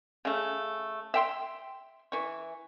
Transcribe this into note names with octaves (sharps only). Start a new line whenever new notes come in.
C#3 A3
E5 G5 C6
E3 C#6